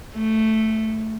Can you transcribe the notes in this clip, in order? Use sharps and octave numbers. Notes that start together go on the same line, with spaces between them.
A3